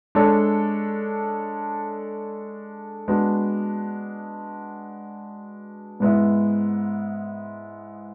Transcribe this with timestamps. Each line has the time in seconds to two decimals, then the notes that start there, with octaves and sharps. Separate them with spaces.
0.15 G#3 D4 A4 C#5
3.08 G#3 B3 D4 F#4 B4
6.00 G#2 G#3 B3 E4